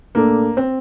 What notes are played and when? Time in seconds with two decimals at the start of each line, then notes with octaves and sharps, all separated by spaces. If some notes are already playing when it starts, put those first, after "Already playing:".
0.15 A#2 A3 A#3 D4 A4
0.57 C4